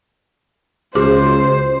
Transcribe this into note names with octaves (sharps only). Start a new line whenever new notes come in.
C#2 F#4 G#4 C5 D6